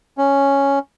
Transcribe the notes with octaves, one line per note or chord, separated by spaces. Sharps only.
C#4